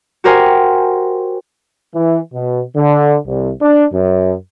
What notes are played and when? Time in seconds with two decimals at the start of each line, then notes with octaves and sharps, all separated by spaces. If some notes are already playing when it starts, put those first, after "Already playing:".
0.24 F#4 G4 A#4 C5 F#5 G#5
1.93 E3
2.33 B2
2.75 D3
3.26 C2
3.61 D4
3.91 F#2